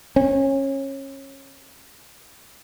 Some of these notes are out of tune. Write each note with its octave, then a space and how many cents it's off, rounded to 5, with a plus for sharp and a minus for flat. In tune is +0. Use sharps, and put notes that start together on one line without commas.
C#4 -25